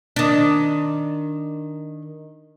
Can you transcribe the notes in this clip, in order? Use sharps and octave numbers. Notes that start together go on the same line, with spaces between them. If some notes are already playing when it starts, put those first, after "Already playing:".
D#3 D4